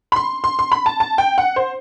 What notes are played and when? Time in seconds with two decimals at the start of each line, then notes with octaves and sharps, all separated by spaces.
0.12 B5
0.16 C6
0.44 C6
0.59 C6
0.72 B5
0.86 A5
1.00 A5
1.18 G5
1.38 F#5
1.56 C5